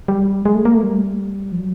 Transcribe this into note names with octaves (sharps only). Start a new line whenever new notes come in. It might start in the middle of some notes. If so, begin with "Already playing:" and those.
G3
G#3
A3
A#3
A3
G3
F3
F#3